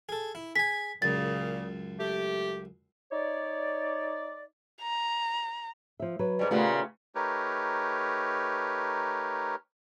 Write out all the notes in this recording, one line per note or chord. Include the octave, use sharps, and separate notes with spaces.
G#4 A4
E4
G#4 G#5 B6
C#2 F#2 A#2 C#3 A6
A3 G4
D#4 C#5 D5
A#5
F3 E5
F#3 B4
G#2 G3
A#2 C#3 A3 B3 F4 G4
A3 D#4 G4 A#4 B4 C#5